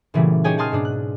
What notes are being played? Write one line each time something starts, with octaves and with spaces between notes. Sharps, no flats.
A#2 C#3 E3 F#3 G3 A3
D#4 G4 G#4 C#5 G5 G#5
F#5 G#5 A5 C6 D#6 F6
G#2 B2 D4
F#6